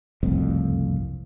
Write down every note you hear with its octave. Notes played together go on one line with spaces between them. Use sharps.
F#1 C2 F2 A2